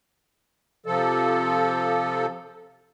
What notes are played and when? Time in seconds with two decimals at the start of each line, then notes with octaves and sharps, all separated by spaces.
0.86 C3 F3 A4